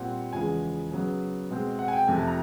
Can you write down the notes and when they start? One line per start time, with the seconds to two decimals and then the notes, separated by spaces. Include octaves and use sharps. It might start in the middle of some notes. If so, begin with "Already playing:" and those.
Already playing: A#2 G3 C4 F#5
0.33 E2 C#3 F3 G#3 G#5
0.91 C#3 F#3 B3
1.50 B2 G#3 C4
1.79 F#5
1.88 G#5
1.93 G5
2.07 F2 C3 F3 A3 G#5
2.18 A5
2.28 A#5